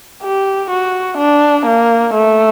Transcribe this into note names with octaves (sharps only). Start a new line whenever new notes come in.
G4
F#4
D4
A#3
A3